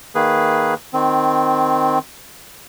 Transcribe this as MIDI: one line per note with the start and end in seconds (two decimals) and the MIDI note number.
0.15 0.74 51
0.15 0.74 58
0.15 0.74 68
0.15 0.74 71
0.93 1.99 51
0.93 1.99 60